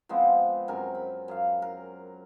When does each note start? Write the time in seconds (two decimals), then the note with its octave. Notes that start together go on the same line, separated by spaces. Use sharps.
0.09 F3 G#3 B3 C4
0.68 F#2 C3 A#4 G#5
0.95 B5
1.28 F#2 F5
1.62 A#4